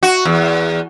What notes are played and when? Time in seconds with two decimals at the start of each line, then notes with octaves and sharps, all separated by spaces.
0.03 F#4
0.25 E2